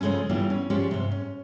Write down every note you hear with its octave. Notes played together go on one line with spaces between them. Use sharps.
C#3 F3 G#3 A3 C#4
E3 G3 A#3 B3 D4 F4
C#4
F3 G#3 C#4 G4 D5
G#2 C3
C#4